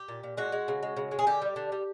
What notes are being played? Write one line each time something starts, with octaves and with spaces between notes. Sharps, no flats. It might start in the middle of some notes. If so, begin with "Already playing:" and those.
Already playing: G4
A#2
A#2
G#3 F#4
G#3
C#3
G#3
C#3
G#3
G#4
D3 G4
G3
D3
G3